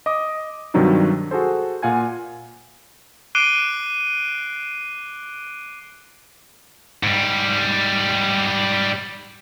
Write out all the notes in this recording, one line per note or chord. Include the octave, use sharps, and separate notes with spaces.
D#5 D6 D#6
G2 C3 D#3 F#3 D4 D#4
F#4 G#4 A4 C5
A#2 F4 F#5 G#5 G#6
D6 F#6 C7 D7 D#7 G7
G#2 G3